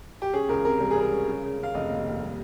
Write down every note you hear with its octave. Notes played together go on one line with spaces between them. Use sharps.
G4
C#4 G#4
C#2 A#4
C3 A#4
G3 A#4
G#4
G3 A#4
C#4
C#3
C#3
C#3 F5
F1 D#5
D#2
D#2
G3